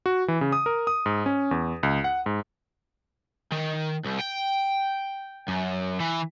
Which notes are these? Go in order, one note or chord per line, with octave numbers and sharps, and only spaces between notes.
F#4
E3
C#3
D#6
A#4
D#6
G#2
C#4
E2
C#2
F#5
G#2
D#3
C2
G5
F#2
E3